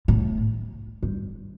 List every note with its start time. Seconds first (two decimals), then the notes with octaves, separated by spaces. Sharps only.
0.08 A2
1.03 G2